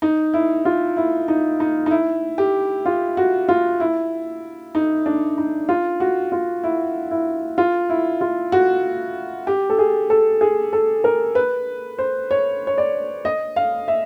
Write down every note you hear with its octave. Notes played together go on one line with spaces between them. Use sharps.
D#4
E4
F4
E4
D#4
D#4
D#4
E4
G4
F4
F#4
F4
E4
D#4
D4
D#4
F4
F#4
F4
E4
E4
F4
E4
F4
F#4
G4
A4
G#4
A4
G#4
A4
A#4
B4
C5
C#5
C#5
D5
D#5
F5
E5